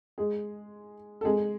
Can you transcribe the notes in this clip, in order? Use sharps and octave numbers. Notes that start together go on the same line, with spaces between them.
G#3 G#4
A4
G#3 G#4